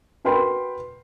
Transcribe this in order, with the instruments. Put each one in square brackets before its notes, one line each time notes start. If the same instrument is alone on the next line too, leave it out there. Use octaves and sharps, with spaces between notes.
[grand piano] F#4 A#4 B4 G5 B5 C6